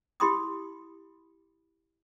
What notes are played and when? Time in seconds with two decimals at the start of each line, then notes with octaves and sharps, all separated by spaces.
0.20 E4 G4 B5 C6 D6 D#6